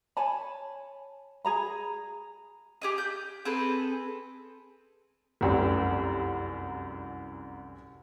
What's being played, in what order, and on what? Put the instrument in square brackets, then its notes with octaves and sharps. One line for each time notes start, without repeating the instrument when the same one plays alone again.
[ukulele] C#5 G#5 A5 B5
G#4 A#5 B5
[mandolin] G4 G#4 D#5
G6
C4 G#4 A4 B4
[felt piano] F1 C2 F#2